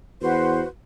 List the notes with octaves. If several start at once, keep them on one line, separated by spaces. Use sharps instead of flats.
E2 F#4 B4 C5